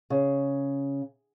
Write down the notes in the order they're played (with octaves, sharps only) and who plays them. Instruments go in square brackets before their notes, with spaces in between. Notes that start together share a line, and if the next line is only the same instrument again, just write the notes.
[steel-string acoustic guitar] C#3